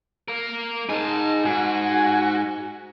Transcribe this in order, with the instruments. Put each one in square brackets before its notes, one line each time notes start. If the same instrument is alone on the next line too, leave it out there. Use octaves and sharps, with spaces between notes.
[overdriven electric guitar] A#3 A#4
[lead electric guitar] D#4 G#4 [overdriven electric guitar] G#5 A5
[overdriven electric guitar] G#2 [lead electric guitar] F#4 [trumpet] G#5